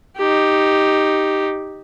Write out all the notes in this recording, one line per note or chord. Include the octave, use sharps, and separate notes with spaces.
D#4 G4